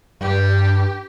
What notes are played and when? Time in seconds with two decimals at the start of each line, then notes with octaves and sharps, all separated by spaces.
0.21 G2 G4